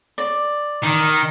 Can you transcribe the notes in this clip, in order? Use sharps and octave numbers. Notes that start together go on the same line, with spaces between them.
D5
D#3